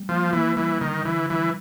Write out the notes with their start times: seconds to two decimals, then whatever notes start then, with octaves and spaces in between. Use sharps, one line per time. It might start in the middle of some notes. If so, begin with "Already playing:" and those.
Already playing: G3
0.09 F3 A#3
0.33 E3 A#3
0.56 E3 G3
0.81 D3 D#3
1.05 D3 E3
1.30 E3 G3